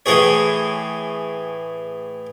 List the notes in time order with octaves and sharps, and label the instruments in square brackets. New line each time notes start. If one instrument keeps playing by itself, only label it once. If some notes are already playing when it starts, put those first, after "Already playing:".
[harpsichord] A2 E3 G#4 C#5